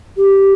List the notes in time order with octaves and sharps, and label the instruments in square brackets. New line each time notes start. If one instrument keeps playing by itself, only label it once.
[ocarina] G4